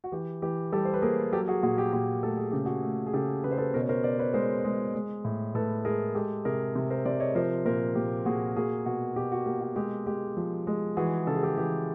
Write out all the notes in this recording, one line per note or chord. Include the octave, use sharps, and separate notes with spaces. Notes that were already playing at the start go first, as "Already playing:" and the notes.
F#4
E3 G4
E3 G4
G3 G4 A4
C5
B4
A#3 G#4 A#4
F#3 G4 A4
F#4 G#4
A#2 F#4 G#4
G4
A#2 G4
A3 A4
G#4
C#3 G4
F#4 G#4
A3
G#4
C#3 G4 A4
C#3 B4
C5
A4 B4
B2 A#4 C5
C#5
A#4 C5
B2 C5 D5
B4 C#5
G#3 A#4 C5
G#3
G#3
A2
A2 A4 B4
G#3 G#4 A#4
G#3 G4 A4
C3 G#4 A#4
C3
A#4 C5
C3 C5 D5
C#5 D#5
F3 A#4 C5
A#2 A#4 C5
A#2 G4
A#2 F#4 G#4
A#3 F#4 G#4
B2 F#4
B2 G4
F#4
A#3 G4
F#4
G#3 G4
G#3 G4
F3
G#3
E3 F#4 G#4
C#3 A4
G#4
G4 A4
E3 G4